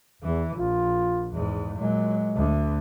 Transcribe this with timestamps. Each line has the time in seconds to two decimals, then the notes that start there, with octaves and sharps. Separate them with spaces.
0.23 E2 E3
0.57 A#1 F4
1.32 E2 G#2
1.79 A#2 F#3 G#3
2.36 D2